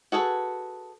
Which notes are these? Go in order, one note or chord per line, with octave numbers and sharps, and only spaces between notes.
F#4 G#4 A4 B4